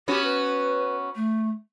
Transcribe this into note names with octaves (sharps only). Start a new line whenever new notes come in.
B3 C#4 F#4 G4
B4
A3